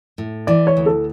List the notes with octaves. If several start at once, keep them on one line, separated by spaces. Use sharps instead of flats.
A2
E3 D5
C#5
D2
A4